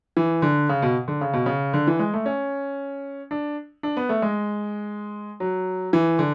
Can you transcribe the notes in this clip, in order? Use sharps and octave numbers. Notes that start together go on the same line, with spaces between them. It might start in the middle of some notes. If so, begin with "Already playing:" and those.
E3
D3
C#3
B2
D3
C#3
B2
C#3
D3
E3
G#3
A3
C#4
D4
D4
B3
A3
G#3
F#3
E3
D3